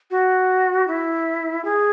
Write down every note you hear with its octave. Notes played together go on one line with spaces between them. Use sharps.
F#4
E4
G#4